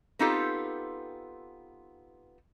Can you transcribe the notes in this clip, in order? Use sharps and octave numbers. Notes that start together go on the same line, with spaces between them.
B3 C4 D#4 F4 G4 A4